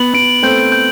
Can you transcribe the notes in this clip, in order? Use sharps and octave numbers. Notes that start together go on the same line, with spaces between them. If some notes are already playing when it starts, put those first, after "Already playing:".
Already playing: B3 F#7
B3 D7
A3 C4 G6
G6